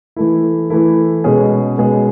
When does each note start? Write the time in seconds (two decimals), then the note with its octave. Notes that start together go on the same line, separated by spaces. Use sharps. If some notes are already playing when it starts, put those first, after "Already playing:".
0.16 E3 A3 E4
0.70 E3 A3 E4
1.24 B2 G#3 C#4 G#4
1.78 B2 G#3 C#4 G#4